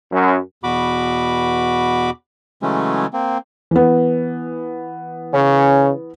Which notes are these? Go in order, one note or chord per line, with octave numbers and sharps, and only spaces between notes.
F#2
E2 B2 F#4 B5 D6
C#3 E3 F#3 G#3 A3 C#4
A#3 C4
E3 B3
C#3 C#4